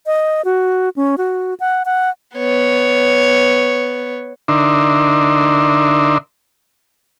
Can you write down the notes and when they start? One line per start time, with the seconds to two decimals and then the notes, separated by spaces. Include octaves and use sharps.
0.06 D#5
0.45 F#4
0.96 C#4
1.18 F#4
1.60 F#5
1.85 F#5
2.37 B3 C#5
4.48 D3 D4 D#4 A#4 E5 C6